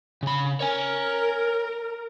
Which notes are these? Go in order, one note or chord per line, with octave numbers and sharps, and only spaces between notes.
C#3 B5
A#4 C#5 G#5